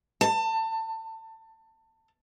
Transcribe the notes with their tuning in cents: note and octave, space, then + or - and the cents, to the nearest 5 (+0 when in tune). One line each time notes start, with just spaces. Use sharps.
A5 +25